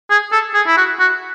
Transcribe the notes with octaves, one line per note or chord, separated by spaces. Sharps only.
G#4
A4
G#4
E4
F#4
F#4